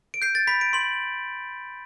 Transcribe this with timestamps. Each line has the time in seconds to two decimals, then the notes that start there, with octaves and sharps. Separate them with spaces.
0.14 D7
0.22 G6 C7
0.35 A6
0.47 B5 B6
0.61 D7
0.73 C6 F#7